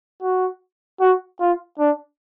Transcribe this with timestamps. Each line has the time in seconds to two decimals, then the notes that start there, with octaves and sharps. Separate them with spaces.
0.22 F#4
1.00 F#4
1.40 F4
1.79 D4